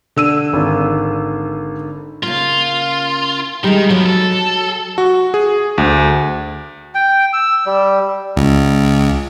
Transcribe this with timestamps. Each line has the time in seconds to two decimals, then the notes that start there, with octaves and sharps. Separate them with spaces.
0.16 D3 E6 D#7
0.53 G#1
2.23 C#3 A#3 F4
3.64 D#3 G3 G#3 D#4
3.90 F3 F#3 B3 F#4
4.06 A4
4.98 F#4
5.34 G#4
5.78 D2
6.95 G5
7.33 E6
7.66 G3
8.37 C#2